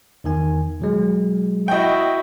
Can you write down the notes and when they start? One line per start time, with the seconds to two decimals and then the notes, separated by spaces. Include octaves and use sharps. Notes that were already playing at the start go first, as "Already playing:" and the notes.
0.24 E2 D#3 G#5
0.80 B2 F#3 G#3
1.68 E4 F#4 D#5 G5